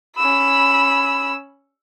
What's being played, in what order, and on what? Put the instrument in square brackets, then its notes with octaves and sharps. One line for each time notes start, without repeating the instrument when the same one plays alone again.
[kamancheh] C#4 E6 [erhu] B5